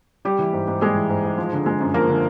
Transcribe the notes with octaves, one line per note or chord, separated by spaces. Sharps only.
G3 G4
E3
G#2
G#2
G3 G#3 G#4
E3
G#2
G#2
F3
D3
G#3
F#2
F3 A#3 A#4
D3